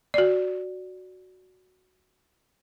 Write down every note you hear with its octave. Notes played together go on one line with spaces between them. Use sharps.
F#4 D5